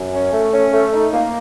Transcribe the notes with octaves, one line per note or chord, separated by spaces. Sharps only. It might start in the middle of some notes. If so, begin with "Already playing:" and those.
Already playing: F#2
C#4
A3
C#4
A3
D#4
A#3